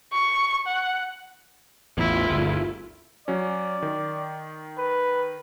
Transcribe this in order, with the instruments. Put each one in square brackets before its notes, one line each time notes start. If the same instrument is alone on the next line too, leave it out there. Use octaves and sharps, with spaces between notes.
[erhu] C#6
F#5
[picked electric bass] A1 E2 [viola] E4 F4
[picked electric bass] G1 D2
[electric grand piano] F#3 C#4 [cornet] D5
[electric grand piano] D#3
[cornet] B4